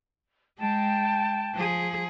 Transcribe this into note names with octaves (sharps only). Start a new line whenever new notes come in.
G#3 G5 A5
F3 G#4